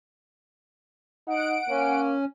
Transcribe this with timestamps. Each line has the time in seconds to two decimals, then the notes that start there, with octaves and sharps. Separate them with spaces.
1.27 D#4 F#5 D7
1.68 A#3 C#4